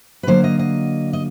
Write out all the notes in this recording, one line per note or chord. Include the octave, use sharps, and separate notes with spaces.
B4
D3 F#3 A#3 C5
D#5
D#5
D#5